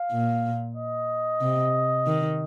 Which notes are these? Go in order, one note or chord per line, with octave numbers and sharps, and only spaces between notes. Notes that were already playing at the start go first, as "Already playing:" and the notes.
Already playing: F5
A#2
D#5
C3
D#3